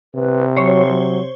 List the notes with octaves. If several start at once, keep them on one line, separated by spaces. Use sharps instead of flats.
C3 B4
F#3 C5 C#5
F#3